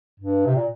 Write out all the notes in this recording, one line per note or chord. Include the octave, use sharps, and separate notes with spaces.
G2
C3
A#2